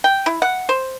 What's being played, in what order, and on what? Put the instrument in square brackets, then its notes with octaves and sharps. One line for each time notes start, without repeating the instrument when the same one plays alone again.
[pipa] G5
E4
F#5
C5